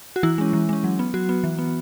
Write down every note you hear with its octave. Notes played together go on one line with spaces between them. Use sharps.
F#4
E3 E4
G#3 C#4
E3
G#3 C#4
F#3
B3
F#3 F#4
B3
E3
B3